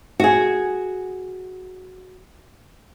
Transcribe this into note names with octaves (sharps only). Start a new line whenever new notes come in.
F#4 G#4